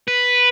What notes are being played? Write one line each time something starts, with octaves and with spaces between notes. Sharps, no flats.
B4